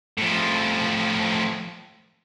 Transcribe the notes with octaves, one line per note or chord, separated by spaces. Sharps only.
A2 F3